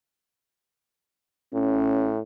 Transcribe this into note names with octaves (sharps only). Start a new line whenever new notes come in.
A2 C#4